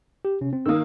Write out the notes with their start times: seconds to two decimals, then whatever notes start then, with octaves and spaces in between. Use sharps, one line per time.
0.25 G4
0.41 C3 C#4
0.53 C4
0.66 D#3 A#3 D#6 E6